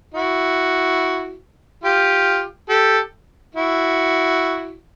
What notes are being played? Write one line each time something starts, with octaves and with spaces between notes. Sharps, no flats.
E4 F#4
F4 G4
G4 A4
E4 F#4